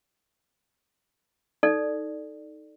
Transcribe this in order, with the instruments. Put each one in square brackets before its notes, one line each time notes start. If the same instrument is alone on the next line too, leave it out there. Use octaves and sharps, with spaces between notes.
[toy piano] D#4 A4 D5